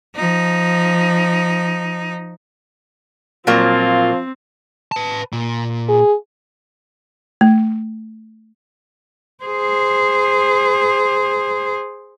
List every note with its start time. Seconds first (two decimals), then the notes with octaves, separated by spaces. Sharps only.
0.16 F3 D#4
3.47 A#2 F3 F#3 A#3 C4 F4
4.92 B4 A5
5.33 A#2
5.89 G#4
7.41 A3
9.44 G#4 C5